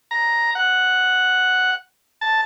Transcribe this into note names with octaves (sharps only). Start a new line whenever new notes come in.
A#5
F#5
A5